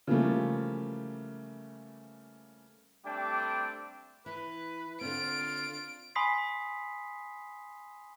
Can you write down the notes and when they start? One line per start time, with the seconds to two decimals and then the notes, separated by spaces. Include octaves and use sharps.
0.07 C#3 E3 F3 G3 A3 A#3
3.05 G3 A3 C4 D4 G5 D6
4.26 E3 B4
5.01 D3 C4 F4 D7
6.15 G#5 B5 C6 D#6 B6 C7